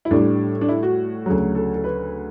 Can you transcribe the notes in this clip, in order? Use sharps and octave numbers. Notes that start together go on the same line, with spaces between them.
E4
A2 G3 D4
D4
E4
F#4
D2 C#3 F#3
A4
A4
B4